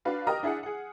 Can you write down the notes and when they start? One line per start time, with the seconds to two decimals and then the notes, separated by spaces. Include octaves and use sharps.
0.05 D4 F#4 B4 F5
0.27 G4 A#4 D#5 A#5 D#6 F6
0.43 D4 E4 G#4 E5 F#5
0.63 G#4 F#5